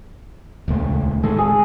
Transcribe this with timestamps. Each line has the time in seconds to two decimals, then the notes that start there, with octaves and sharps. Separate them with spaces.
0.68 D#1 C#2 A3
1.23 A2 D#3 G#3 A4
1.38 G#4